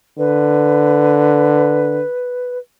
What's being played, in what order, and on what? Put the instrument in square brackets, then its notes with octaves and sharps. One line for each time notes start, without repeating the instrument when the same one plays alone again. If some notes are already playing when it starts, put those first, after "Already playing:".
[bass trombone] D3 [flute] B4